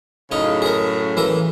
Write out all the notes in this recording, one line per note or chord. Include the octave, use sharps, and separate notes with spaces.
F#2 A2 C#3 D#4 C#5
G#4 A#4
E3 A#4 E5